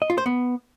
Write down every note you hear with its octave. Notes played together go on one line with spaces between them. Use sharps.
D#5
F4
C5
B3